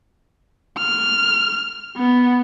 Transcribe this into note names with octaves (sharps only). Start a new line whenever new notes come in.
F6
B3